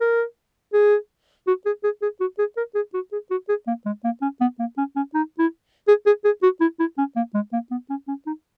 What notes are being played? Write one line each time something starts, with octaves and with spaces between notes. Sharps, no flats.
A#4
G#4
F#4
G#4
G#4
G#4
F#4
G#4
A#4
G#4
F#4
G#4
F#4
G#4
A#3
G#3
A#3
C#4
B3
A#3
C#4
C#4
D#4
E4
G#4
G#4
G#4
F#4
E4
E4
C#4
A#3
G#3
A#3
B3
C#4
C#4
D#4